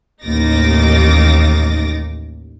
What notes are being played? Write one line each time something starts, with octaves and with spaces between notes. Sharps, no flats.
A1 D#2 D#4 D6 A6 A#6